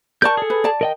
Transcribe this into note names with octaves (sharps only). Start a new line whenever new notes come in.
A#4 D5 A5 C#6 G6
G#4 A4
B4
D5 A5
A#4 D#5 G5